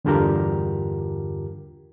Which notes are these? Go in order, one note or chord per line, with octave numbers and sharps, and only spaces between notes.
E2 G2 D3 F4 G4 A#4